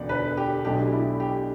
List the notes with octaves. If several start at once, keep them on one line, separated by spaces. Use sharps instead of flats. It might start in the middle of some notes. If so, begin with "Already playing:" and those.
Already playing: E1 D2 D3 B3 D4 D5
B4
G4
B1 B2 A3 D4 G4
E4
G4